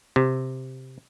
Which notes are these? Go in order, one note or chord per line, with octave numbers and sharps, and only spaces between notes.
C3